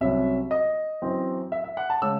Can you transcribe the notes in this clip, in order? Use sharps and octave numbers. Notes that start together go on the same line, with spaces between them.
C2 C3 F#3 C#4 E5
D#5
F#2 E3 C4
E5
E5
F#5
A5
C#3 G#3 C#4 E6